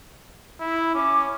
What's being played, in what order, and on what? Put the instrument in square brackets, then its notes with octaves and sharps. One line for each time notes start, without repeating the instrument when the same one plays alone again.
[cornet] E4
[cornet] C#4 [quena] D6